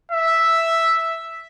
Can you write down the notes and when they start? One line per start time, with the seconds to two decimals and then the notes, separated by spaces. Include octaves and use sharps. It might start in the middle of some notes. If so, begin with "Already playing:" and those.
0.11 E5